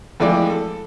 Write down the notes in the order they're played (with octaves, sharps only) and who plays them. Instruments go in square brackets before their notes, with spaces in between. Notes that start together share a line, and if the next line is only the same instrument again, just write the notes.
[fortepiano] F2 E3 G#3 A3 D5
A4